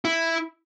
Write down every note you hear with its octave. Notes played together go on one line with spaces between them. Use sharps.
E4